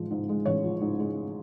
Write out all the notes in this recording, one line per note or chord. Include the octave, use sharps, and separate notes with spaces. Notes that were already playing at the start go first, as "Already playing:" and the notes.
Already playing: A1 G#2 F3 G#3
G#2
G#3
A1 C#5
F3
G#2
G#3